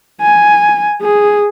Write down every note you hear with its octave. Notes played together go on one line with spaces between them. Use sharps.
G#5
G#4